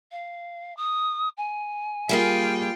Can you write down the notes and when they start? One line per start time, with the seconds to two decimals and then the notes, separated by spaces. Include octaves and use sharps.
0.12 F5
0.77 D#6
1.37 G#5
2.09 G3 A#3 F4 G#4 G5